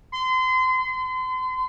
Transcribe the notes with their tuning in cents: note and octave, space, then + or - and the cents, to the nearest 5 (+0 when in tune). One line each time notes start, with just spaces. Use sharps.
C6 -30
C6 -35